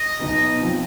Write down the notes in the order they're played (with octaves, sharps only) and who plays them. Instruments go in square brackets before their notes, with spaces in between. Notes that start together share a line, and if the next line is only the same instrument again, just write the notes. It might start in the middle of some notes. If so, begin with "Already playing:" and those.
Already playing: [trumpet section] D#5
[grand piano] B1 B2 B3 D#4
F3 C4